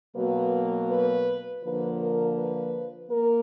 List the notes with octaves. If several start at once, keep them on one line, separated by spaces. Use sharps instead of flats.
B2 F#3 A#3 B4
B4
D3 F3 A#3 B4
A#4
B4
A#3 A#4